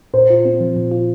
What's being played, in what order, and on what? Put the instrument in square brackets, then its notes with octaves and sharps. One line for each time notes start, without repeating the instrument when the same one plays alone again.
[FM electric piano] A#2 [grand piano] C5
[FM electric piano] F4
C4
F3
A#2
F4